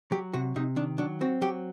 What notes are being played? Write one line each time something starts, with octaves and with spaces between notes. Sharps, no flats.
F#3 G4
C3 F#4
C3 D#4
D#3 D4
F#3 D4
C4 F#4
F#3 G4